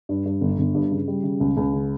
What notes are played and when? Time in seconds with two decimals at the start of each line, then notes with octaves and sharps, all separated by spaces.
0.09 G2
0.25 G2
0.41 G1
0.59 G1
0.74 G2
0.91 C#3
1.08 G3
1.24 C#3
1.40 C#2
1.57 C#2
1.73 C#3